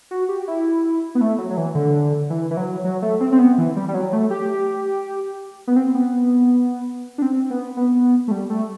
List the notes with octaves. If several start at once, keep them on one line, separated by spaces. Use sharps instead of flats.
F#4
G4
E4
B3
A3
F#3
F#3
E3
D3
E3
E3
F#3
F#3
A3
C4
C4
B3
E3
G3
G3
F#3
A3
G4
B3
C4
B3
D4
C4
B3
B3
A3
G3
A3